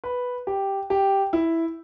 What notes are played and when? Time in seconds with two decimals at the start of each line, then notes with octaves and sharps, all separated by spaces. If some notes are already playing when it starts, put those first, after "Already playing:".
0.04 B4
0.47 G4
0.90 G4
1.33 E4